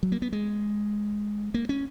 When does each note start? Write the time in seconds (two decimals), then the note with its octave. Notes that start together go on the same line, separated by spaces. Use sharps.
0.03 F#3
0.12 A#3
0.22 B3
0.33 G#3
1.54 A#3
1.69 C#4